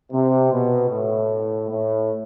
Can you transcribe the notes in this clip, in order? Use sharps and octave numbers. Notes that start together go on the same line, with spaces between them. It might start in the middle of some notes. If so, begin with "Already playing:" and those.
C3
B2
A2
A2